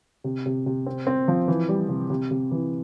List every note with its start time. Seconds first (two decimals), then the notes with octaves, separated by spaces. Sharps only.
0.24 C3
0.46 C3
0.66 C3
0.86 C4
1.07 C4
1.28 F3
1.48 E3
1.69 G3
1.89 C3
2.10 C3
2.31 C3
2.51 E3